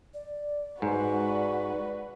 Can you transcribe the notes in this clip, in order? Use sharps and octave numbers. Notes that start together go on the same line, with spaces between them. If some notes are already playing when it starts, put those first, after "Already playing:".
D5
G#2 F#4 B4